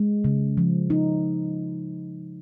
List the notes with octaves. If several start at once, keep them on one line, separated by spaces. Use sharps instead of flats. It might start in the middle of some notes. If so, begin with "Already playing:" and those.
Already playing: G#3
C#3
F3
D#4